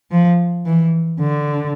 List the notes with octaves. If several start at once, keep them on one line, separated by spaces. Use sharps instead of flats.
F3
E3
D3